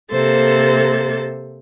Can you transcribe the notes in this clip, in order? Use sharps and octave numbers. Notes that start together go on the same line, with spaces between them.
C3 A#3 A4 C5 A6